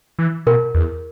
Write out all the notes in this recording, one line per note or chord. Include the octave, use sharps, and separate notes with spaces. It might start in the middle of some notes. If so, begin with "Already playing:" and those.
E3
B2 A#4
E2